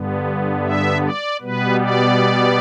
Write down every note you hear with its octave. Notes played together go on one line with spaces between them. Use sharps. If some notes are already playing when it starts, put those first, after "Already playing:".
Already playing: G2 D3 B3
E5
D5
B2 G3 B3 B4
D5